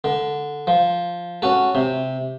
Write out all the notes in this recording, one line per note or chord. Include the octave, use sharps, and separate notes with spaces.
D3
F3
C#4 F#4 A4
C3